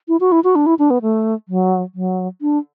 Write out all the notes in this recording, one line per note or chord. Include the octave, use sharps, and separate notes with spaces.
E4
F#4
E4
F#4
D4
E4
D4
B3
A3
F#3
F#3
D4